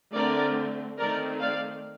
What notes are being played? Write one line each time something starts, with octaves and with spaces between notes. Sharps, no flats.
D3 A3 C4 A#4 D5
D#3 A3 C4 A#4 D5
D5 F5